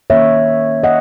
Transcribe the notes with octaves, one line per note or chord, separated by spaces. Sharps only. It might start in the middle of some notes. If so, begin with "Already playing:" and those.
D#3 A#3 C#4 C#5 E5
D#5 F#5